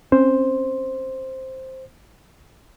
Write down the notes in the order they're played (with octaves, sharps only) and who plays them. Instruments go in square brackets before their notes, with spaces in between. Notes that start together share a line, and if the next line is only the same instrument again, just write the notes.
[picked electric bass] C4 C#4 [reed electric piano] C5